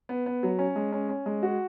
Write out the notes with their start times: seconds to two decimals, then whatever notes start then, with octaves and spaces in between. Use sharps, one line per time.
0.09 B3
0.26 B3
0.43 F#3
0.59 C#4
0.76 G#3
0.92 C#4
1.09 C#4
1.26 G#3
1.43 F#4